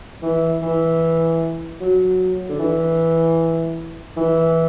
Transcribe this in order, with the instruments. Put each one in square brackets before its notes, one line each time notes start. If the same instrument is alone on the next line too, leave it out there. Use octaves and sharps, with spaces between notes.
[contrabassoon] E3
E3
F#3
D3
E3
E3